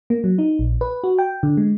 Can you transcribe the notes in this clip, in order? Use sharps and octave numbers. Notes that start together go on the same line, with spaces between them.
A#3
F#3
D#4
A#1
B4
F#4
G5
D3
G#3